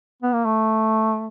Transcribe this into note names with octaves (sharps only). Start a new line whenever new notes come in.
B3
A#3
A3